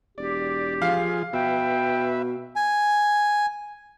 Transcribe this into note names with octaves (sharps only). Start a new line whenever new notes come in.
E1 G4 D5
F3 F4 G#4 F5
B2 B4 E5 G5
G#5